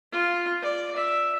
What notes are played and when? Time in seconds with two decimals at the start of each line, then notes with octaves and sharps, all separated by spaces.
0.12 F4
0.62 D5
0.96 E5